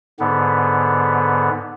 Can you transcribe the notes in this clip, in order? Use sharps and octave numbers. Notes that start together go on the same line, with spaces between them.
G#2 D3 B3